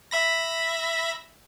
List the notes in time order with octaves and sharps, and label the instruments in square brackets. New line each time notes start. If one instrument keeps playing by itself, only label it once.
[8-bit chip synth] E5 B5 A#6